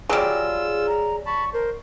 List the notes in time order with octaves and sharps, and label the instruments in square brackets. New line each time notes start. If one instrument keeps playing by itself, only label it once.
[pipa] F#3 G3 [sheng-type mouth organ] F4 E6 [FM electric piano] G#4
[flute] A#5
[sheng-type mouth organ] A5 B5 [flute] C#6
[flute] A#4 [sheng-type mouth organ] C5